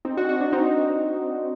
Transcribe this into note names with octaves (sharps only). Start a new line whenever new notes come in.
C4 D#4
D4 F#4
D4 F#4
D4 F#4
C4 D#4